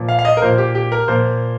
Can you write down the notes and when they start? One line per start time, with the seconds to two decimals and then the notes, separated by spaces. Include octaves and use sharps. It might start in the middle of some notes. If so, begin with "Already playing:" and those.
Already playing: A#2 F3 A#3
0.09 F5
0.19 F5
0.25 D#5
0.37 A#4
0.42 A#2 F3 A#3 C5
0.58 G4
0.75 G4
0.92 A#4
1.08 A#2 F3 A#3 C5